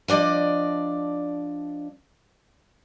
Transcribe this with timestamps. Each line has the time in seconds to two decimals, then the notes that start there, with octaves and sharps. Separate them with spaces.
0.08 F3 D4 D5 D#5